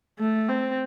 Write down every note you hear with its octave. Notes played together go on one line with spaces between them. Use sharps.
A3
C4